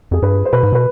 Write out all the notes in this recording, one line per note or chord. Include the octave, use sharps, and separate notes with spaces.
F2 G#4
G2 B4
C5
B2 B4
G#2
B2 B4